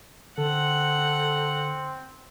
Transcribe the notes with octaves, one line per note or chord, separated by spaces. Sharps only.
D3 C4 A4 F#5